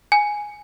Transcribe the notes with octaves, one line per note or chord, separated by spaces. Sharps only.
G#5